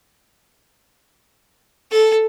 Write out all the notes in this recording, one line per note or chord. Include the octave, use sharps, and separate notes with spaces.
A4